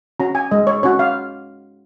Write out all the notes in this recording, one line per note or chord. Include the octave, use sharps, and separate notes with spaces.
C#4 F#4 A#5
G#5
G#3 D#5
C#5
C#4 F#4 C#5
F5